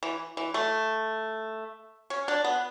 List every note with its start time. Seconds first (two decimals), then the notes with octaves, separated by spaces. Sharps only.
0.03 E3
0.37 E3
0.54 A3
2.10 C#4
2.28 D4
2.44 B3